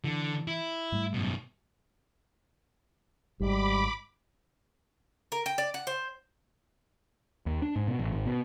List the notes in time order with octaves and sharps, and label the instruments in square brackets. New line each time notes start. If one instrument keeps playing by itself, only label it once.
[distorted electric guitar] D3 [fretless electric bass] E3
[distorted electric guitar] E4
[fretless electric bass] G#2 G3 A3
[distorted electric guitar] F#2 B2
[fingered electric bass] G#1 G#2 [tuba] G3 [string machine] B5 D6
[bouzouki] A#4
G5
D5
F#5
C5
[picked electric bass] D#2
D4
G#2
B2
A1
G#1
B2